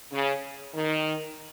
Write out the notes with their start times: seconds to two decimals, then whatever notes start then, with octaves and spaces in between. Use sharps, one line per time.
0.11 C#3
0.74 D#3